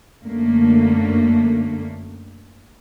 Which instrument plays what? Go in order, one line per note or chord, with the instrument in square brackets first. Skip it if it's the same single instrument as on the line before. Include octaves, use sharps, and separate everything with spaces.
[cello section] F#2 D3 A3 A#3